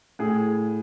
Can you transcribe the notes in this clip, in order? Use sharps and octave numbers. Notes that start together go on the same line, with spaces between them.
A2 G#4